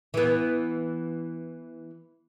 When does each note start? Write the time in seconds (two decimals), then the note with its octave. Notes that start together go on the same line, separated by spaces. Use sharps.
0.14 E3 B3